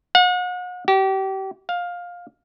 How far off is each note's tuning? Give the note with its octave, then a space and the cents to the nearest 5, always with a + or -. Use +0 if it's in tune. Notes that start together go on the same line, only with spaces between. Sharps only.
F#5 -40
G4 -30
F5 +15